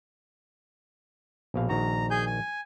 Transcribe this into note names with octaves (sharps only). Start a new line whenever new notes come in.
A#1 B2 F5
A#1 D#3 F#4 A#5
G#4 G#5 G6
G#5